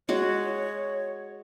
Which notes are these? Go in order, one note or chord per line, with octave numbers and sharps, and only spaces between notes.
G#3 F#4 C#5